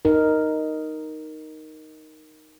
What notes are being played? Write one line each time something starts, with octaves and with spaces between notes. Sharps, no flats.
D#4 A#4